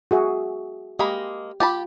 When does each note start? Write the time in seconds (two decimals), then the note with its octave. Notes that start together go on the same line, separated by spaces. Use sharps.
0.11 F#4 G#4 E5
0.99 G#3 A#3 G4 B5
1.60 F4 G4 A5 B5